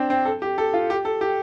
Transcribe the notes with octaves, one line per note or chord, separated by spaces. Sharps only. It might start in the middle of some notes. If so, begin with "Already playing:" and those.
Already playing: C4 D4
C4
A4
G4
A4
F4
G4
A4
G4